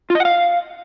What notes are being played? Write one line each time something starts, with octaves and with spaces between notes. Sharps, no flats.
F4
D#5
F#5
F5